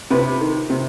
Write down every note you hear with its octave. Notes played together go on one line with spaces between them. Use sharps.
C3 B4
D#3
C3